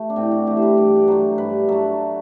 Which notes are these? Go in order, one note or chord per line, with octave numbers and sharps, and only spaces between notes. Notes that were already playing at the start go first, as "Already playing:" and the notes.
Already playing: A3
D4
A2 C4
F#4
E3 A3 G4
C5
B4
G2 D5
D5
F#3 A3 C5
G2 B4
F#3 A3 A4